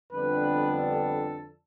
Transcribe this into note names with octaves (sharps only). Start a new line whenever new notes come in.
F2 D3 G3 B3 D4 B4
A4